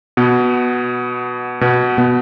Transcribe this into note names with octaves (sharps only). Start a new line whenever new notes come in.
B2 B3
B2 B3
B2 B3